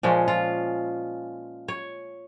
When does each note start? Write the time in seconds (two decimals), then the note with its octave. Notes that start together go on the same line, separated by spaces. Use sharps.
0.03 A#2 F3 G#3 C#4
0.28 F4
1.68 C#5